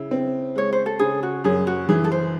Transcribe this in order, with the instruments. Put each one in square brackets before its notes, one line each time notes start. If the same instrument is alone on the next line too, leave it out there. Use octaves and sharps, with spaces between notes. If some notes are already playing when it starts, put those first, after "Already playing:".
Already playing: [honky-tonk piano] C#3 [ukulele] E4
[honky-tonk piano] C4
[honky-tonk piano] G#3 [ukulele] C#5
[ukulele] C5
A4
[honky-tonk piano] C#3 [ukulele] G#4
[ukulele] F#4
[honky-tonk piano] F#2 [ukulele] G#4
[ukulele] F#4
[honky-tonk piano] E3 [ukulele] G#4
[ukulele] A4
C5